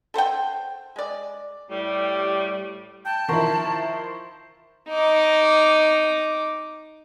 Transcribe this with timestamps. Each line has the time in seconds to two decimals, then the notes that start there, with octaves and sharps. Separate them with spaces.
0.14 A4 C5 F#5 G5
0.96 G#3 D5
1.69 A2 G3
3.05 G5 A5
3.29 D#3 F3 E4 C5 A#5 C#6
4.89 D#4 D6